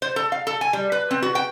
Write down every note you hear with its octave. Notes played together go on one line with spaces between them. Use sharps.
C5
A4
F5
A4
G#5
G3
B4
C4
F#4
G5